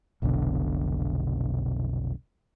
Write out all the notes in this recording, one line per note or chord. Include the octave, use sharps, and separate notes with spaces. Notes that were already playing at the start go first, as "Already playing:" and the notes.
F1 B1 B2 D3